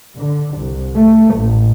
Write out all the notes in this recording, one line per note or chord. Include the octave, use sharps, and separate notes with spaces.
D3
C2
A3
A1